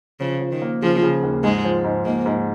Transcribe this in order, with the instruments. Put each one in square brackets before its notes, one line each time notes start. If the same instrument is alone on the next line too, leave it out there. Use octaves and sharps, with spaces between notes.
[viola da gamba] C#3 [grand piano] F3
[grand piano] F3
[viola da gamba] D#3
[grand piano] A#3
[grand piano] C#3 [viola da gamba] F3
[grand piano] C#3
D#2
[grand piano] G#2 [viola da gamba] G#3
[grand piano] F3
G#2
[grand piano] G#2 [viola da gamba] A#3
[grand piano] G#2